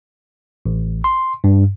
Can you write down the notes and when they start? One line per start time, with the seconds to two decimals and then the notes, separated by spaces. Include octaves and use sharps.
0.66 A1
1.04 C6
1.44 G2